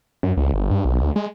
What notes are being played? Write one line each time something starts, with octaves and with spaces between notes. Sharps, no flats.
F#2
C#2
G1
G2
B1
D2
G#3